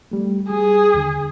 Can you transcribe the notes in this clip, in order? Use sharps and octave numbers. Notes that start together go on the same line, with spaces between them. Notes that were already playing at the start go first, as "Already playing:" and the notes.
G3 A3
G3 G#4
D#2 D3